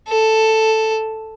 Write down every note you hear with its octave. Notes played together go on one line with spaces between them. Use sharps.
A4